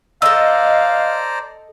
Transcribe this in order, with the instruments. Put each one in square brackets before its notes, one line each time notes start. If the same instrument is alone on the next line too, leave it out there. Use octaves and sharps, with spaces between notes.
[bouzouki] A4 D#5 [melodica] C5 D5 A#5 [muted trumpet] F5 [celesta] E6